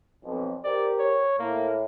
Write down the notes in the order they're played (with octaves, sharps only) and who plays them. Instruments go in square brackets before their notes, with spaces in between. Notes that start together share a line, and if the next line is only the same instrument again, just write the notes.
[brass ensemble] B1 F2
[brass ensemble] G4 A#4 C5 [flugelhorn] D5
[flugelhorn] C#5
[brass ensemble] A2 [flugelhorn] A#3